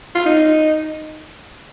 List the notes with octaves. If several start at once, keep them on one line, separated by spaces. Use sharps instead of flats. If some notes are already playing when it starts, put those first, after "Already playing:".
F4
D#4